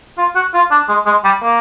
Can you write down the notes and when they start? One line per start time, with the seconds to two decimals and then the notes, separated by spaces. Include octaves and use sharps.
0.18 F4
0.35 F#4
0.54 F4
0.71 D4
0.89 G#3
1.06 G#3
1.24 G3
1.43 A#3